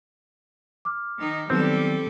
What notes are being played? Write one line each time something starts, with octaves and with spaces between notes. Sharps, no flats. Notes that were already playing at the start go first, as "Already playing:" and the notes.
D6 F6
D#3 D#4
D#3 F#3 G3 B3 C4 A4